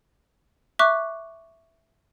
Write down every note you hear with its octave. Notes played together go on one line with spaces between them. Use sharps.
E5 C#6 D6 F#6